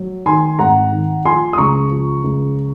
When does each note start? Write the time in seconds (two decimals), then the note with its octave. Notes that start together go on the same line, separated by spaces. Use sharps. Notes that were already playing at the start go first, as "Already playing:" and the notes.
Already playing: F#3
0.26 D#3 G#5 C6
0.59 G#1 F#5 A#5
0.92 D#3
1.25 F3 G#5 C6
1.53 D#6
1.58 C#2 A#5 C#6
1.90 F3
2.24 C#2